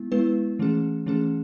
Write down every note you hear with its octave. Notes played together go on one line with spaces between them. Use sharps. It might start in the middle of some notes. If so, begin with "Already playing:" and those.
Already playing: G#3 B3 E4
G#3 B3 E4 B4
E3 A3 C#4 G#4
E3 A3 C#4 G#4